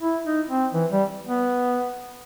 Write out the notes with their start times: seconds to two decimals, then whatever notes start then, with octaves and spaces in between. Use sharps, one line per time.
0.01 E4
0.25 D#4
0.49 C4
0.73 E3
0.91 G3
1.27 B3